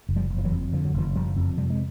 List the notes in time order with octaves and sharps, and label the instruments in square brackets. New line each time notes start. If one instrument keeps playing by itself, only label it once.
[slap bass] F#1
F3 G3
F#1
F3
E3 F#3
F2
D3 F3
F#3
F#1 D#3 F3
F#1 F3 G3
F2
C3 G3
G#3